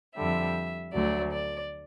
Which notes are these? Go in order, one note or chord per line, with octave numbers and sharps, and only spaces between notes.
F2 D3 G3 E5
D2 D3 F#3 A3 D5
D5